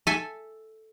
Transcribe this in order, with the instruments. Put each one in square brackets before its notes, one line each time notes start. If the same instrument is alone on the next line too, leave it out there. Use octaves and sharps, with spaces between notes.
[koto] A4 E5 G#5